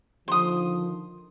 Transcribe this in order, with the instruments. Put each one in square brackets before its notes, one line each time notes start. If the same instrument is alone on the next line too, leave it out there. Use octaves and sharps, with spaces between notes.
[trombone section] D3 D#3 F3 [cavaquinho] C6 D#6